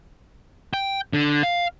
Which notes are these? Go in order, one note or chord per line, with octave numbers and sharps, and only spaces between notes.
G5
D3
F5